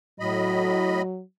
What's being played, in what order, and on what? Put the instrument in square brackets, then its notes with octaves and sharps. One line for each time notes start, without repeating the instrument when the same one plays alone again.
[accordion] A2 D#5 B5 [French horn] F#3